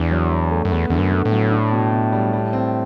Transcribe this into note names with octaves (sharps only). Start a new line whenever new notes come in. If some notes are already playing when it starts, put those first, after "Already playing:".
Already playing: E2 E3 D4
F#3
F#3
A3
F#2
E2 B3
E2 D3
F#2
D3
A2
F#3
D4
B2
B2
G3
G3
C4